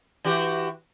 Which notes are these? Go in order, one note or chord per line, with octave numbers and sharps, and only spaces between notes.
E3 F#4 G4